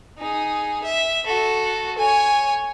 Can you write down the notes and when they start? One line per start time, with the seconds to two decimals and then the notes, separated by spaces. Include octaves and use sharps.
0.19 D#4 G#4
0.84 E5
1.26 F#4 A4
1.98 C#5 G#5